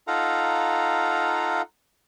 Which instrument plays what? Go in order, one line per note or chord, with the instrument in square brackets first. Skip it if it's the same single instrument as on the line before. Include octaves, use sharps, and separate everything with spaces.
[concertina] D#4 F4 A4 F5 F#5 A#5